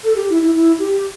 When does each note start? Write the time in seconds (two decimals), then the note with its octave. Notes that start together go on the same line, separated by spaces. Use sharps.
0.04 A4
0.16 G4
0.30 E4
0.42 E4
0.55 E4
0.79 G4